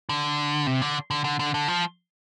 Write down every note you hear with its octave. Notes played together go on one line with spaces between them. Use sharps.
D3
C3
D3
D3
D3
D3
D3
F3